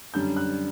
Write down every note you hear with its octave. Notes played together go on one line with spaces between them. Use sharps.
F#2 D3 G3 D4 G6
F#6